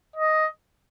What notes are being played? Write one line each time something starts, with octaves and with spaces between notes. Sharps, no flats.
D#5